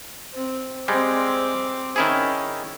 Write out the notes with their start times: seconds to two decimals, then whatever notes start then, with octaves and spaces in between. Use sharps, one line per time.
0.33 C4
0.88 G3 G#3 C4 D6
1.96 D#3 C#4 E4 G#4